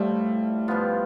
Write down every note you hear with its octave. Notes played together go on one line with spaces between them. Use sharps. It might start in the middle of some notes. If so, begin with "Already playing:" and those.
Already playing: A2 F3 G3 A3
G2 F3 B3 F4